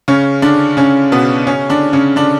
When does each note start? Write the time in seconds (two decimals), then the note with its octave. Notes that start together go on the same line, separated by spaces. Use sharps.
0.08 C#3 C#4
0.42 D3 D4
0.77 C#3 C#4
1.12 B2 B3
1.47 C#3 C#4
1.69 D3 D4
1.93 C#3 C#4
2.16 D3 D4